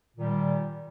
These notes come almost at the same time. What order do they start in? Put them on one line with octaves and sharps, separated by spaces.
A#2 D#3 G3